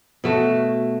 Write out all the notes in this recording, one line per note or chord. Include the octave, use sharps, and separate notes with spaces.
B2 A3 F#4